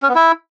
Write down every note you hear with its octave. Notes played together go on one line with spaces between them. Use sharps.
C#4
B3
E4